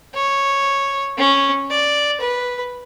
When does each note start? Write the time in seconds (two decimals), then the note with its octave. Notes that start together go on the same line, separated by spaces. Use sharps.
0.14 C#5
1.18 C#4
1.70 D5
2.21 B4